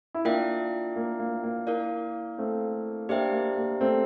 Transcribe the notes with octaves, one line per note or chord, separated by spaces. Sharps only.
E4
A#3 D4 F4 A#4 E5 G5
A#3
A#3
A#3
E4 A#4 D5 F5
A3 C4
A#3 D4 G4 C5 E5 G5
A#3
A#3
A3 C4